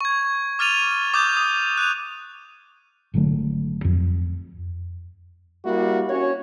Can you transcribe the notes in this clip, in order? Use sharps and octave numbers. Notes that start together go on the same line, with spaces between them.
C#6 G#6
D6 F6 A6 D#7 F7 G7
D6 D#6 G6 F7
D#6
F#6 D#7 F7
G#1 D3 F#3 A3
F2
G3 A#3 E4 F#4
C#4 F#4 C#5